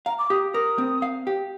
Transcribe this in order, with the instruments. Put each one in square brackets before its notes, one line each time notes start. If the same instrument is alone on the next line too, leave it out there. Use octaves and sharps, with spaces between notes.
[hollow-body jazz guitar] F5 [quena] A#5
[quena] D6
[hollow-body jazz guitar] G4 [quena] D#6
[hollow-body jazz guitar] A#4 [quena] D#6
[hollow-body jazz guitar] C4
F5
G4